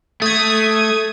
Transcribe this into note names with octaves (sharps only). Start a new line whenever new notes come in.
A3 D#6 G#6